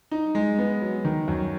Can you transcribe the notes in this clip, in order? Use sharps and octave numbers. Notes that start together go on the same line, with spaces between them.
D#4
G#3
B3
F#3
D#3
F#2